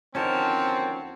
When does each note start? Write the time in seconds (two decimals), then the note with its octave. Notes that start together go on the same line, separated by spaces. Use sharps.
0.15 D#2 D3 F3 C4 C#4 F#4 A#4 A5